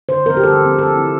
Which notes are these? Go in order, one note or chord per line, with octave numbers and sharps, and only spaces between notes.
D3 C5
F3 C4 A#4
G4
D3 A4
F3 C4
F3 A4
C4 E4